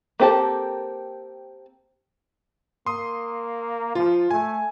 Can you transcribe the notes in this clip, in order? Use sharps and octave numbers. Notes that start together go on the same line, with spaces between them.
A#3 C4 G4 A4 A5
A#3 C6 D#6
F3 F4
A3 G#5